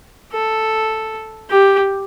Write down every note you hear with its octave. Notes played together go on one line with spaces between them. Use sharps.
A4
G4